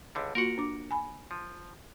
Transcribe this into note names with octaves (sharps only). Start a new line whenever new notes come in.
C#2 D3 G3
A#3 F4 F#4 A#4 F#5
D4 D6
G#5 B5
F3